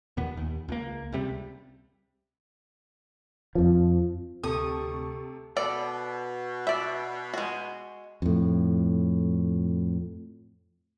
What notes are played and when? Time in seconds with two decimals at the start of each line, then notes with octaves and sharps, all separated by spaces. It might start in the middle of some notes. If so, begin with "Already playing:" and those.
0.17 D#2 A#2 B3
0.37 D#2
0.68 C#2 A#3
1.12 C#2 C3 G3
3.55 F2 F3
4.43 D2 C3 A4 G5 A5 C#6 D#6
5.57 B2 A4 D5
6.67 D5 E5
7.34 G#3 F#4
8.22 F2 A2